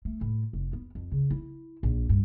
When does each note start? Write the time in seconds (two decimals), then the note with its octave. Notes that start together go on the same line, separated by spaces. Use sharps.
0.05 A3
0.21 A2
0.53 F1
0.73 B3
0.95 F2
1.12 C#3
1.31 E4
1.83 A#1
2.09 G2